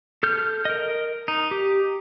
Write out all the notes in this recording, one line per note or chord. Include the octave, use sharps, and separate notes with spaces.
A4 F6 G6
A#4 D#5
D#4
G4